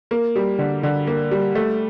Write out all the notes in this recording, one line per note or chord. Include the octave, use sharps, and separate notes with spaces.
A#3
G3
D3
D3
A#3
G3
A3